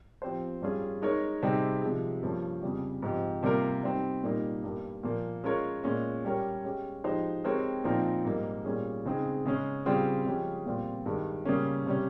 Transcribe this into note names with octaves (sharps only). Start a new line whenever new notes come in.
F3 C4 G4 C5
G2 G3 C#4 F4 G#4
G#3 D#4 A#4 C#5
C3 G3 C4 D#4 G#4
C3 F3 G#3
G2 F3 A#3 C#4
F2 C#3 G3
G#2 F3 C4 G4
C3 G3 A#3 F4 A#4
G3 C4 D#4
A#2 G3 A#3 D#4
G2 G3 A#3
A#2 F3 A#3
G#3 C#4 F4 A#4 C#5
A#2 G#3 C#4
G3 C#4 G4 A#4 C#5
G#3 C#4 G4
F3 G#3 D#4 G4 C5
G#3 C4 G4 A#4 C#5
A#2 F3 C4 D#4 A#4
G#2 G3 A#3
A#2 G3 C#4 G#4
C#3 G#3 C4 D#4 G#4
C#3 G#3 C#4
C#3 G3 C4 F4 G#4
C#3 F3 G#3 C#4 G4
A#2 G3 C4 F4
G2 D#3 G#3
C#3 G3 A#3 C#4
C3 G3 C#4